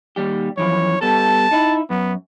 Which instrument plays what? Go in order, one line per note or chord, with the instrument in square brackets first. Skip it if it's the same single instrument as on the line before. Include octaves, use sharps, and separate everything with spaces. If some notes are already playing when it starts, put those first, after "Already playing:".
[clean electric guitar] D#2 G3 G4
[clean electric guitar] F#2 E3 F3 [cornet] C#5
[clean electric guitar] G3 B3 A4 [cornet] A5
[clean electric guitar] D#4 E4
[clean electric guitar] F#2 [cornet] B3